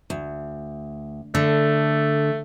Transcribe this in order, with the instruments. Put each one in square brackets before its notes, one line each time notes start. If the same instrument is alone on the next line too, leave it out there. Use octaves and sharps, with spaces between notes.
[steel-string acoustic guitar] D2
[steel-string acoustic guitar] D3 [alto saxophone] A3